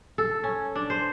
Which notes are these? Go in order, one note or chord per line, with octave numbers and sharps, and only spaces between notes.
A4
C#4
D4
C5